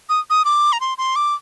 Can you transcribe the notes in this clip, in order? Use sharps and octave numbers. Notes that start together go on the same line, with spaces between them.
D#6
D#6
D6
A#5
C6
C6
D6